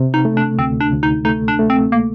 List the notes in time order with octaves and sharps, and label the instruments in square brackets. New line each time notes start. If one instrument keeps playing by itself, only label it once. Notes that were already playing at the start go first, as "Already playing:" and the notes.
Already playing: [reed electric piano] C3
[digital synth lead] D#4
[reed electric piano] A3
[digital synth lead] D4
[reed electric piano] D2 [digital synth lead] C4
[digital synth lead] D4
[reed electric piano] D2
[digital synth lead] D#4
[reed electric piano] A3 [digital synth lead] D#4
[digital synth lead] D4
[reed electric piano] A3
[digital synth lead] C4
A#3